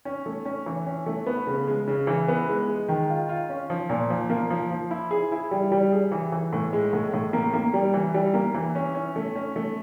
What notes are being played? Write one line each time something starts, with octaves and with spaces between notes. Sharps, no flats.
C#4
A3
C#4
E3
C#4
A3
B3
C#3
G#3
C#3
E3
B3
G#3
G#3
D#3
F4
F4
C#4
F3
A#2
F3
A#3
F3
F3
E4
G#4
E4
G3
G3
G#4
E3
E3
A2
G#3
A2
A2
A#3
A#3
G3
E3
G3
A#3
E3
C#4
C#4
A3
C#4
A3